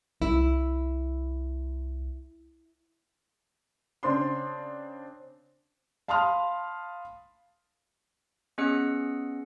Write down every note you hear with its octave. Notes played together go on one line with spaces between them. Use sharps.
C2 E4
C#3 C4 D4 C6
F5 A5 B5 C6 D#6 F6
B3 C#4 G#4 D#5 E6 C#7